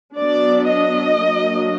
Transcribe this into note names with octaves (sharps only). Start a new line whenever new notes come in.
F#3 B3 D4 D5
D#5
F#3 A#3 D4